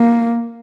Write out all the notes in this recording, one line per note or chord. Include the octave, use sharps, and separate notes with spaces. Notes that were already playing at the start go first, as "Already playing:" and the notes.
Already playing: A#3